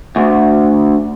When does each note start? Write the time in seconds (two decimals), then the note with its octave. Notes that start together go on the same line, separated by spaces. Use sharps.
0.16 D2